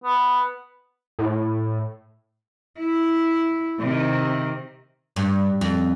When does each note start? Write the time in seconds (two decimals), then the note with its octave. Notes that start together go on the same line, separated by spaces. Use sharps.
0.04 B3
1.19 A2
2.79 E4
3.80 C3 D#3
5.16 G2
5.61 F2